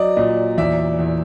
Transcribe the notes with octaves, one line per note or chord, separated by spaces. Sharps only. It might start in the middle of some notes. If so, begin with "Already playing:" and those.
Already playing: F#3 D5 D#5
A#2 D#5
E2 D5 E5
E2